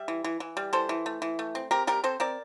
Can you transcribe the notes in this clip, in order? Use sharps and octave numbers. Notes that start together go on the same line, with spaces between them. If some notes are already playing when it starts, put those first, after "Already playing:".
Already playing: G3 E5
E3
E3
E3
G3
E3 A4 C5
E3
A3
E3
A3
C4
C4 G4 A#4
G3 G4 A#4
C4 A4 C5
C4 A#4 D5